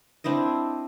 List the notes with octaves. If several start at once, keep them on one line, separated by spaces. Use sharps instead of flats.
C4 D4 E4 D#5